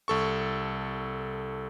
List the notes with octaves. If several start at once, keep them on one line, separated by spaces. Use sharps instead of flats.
C2 A4 C#6